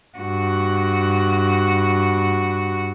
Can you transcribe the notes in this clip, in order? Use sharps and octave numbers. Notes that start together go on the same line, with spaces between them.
G2 F#4